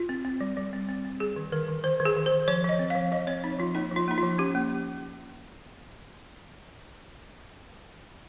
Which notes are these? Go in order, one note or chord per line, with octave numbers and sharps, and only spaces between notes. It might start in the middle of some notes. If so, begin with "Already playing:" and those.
Already playing: F4
C4
C4
G3
G3
C4
C4
C4
G3 G#4
D#3
D#3 A#4
D#3
D#3 C5
D#3
G#4
D#3
C5
D#3
F3 C#5
F3 D#5
C4
F5
F3
F3 D#5
C4 C#5
C4 D#4
F3 F4
A#3 D#4
F3 F4
A#3 D#4
F3 F4
C#4 G4
A#3